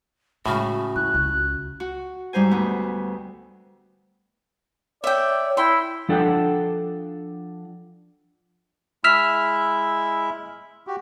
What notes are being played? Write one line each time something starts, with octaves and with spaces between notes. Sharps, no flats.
A2 C#3 G#3 F#4
E4 F#6
C#2
F#4
G#2 G3 D#4 C5 G#5
D2 B3
C#5 D5 E5 G5
E4 G5 C6
F3 D4 A4 F#5 G5
G#3 E4 E5 E6 F6 B6
F#4 G4